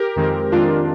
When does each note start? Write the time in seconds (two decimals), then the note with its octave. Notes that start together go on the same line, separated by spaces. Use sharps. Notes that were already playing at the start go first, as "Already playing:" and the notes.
Already playing: G4 A#4
0.16 F2 D#3 G#3 C4
0.52 F2 D#3 G#3 C4 D4 F4